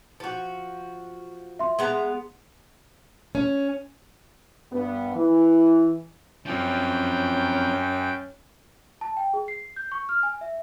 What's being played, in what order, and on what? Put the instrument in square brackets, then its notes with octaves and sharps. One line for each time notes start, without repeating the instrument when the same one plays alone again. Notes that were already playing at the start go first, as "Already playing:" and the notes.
[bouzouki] F3 F#4
[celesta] E5 C6
[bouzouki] G#3 B3 A#5
[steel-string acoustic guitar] C#4
[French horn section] G2 B3
E3
[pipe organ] F#2 G5 [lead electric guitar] F3 C4 [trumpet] C#4
[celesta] A5
G5
G#4
C7
G6
C#6
F6
G#5
E5